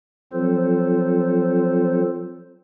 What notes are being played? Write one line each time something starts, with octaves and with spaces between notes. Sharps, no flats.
F3 F#3 C4 F4 A4 C5